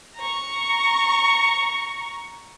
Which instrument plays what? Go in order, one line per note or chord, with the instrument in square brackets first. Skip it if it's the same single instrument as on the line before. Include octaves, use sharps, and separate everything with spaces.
[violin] A#5 C#6